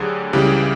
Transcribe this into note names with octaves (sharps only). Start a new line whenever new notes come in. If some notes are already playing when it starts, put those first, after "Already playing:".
Already playing: D2 D3 F#3 G4 G#4
C#2 C#3 E3 G3 G4